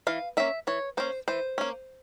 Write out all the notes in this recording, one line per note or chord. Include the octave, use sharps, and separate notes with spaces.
E3 F5
A#3 C#4 E5
E3 C#5
A#3 C#4 C5
E3 C5
A#3 C#4